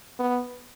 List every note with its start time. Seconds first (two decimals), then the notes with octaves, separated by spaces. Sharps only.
0.20 B3